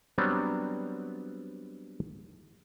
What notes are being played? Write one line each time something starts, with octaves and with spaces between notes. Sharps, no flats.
F#3 G3 B3 C4 D4 C#5